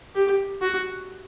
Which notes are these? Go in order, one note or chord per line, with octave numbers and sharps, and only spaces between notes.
G4
F#4